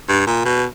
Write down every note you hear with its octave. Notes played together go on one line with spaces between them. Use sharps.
G2
A#2
B2